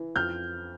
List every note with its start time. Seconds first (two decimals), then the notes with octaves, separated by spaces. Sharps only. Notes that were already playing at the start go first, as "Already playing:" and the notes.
Already playing: E3
0.16 F2 F6 G6